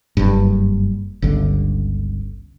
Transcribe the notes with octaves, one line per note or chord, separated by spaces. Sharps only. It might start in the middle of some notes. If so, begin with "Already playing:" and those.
F#1 G2
G1 C#2 D3